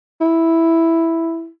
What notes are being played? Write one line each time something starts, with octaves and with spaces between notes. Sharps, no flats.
E4